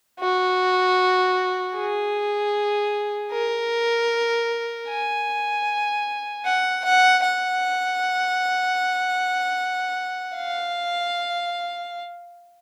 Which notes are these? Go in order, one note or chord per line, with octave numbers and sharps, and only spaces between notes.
F#4
G#4
A#4
G#5
F#5
F#5
F#5
F5